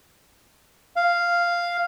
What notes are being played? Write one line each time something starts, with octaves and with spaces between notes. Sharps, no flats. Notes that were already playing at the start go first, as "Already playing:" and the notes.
F5